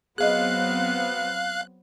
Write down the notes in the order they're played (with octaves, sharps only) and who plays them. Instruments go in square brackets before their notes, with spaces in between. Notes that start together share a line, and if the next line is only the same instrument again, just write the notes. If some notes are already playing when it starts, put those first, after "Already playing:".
[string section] F#3 B3 C4 [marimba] G#4 D#5 [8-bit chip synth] F5 F#6